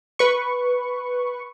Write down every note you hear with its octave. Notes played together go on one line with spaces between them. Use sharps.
B4 C#6